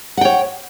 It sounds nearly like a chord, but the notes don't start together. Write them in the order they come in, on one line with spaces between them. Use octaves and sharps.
F#5 G5 C#5